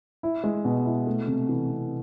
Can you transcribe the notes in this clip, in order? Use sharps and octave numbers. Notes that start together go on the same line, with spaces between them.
E4
G#3
B2
E4
A3
C3
E3
C3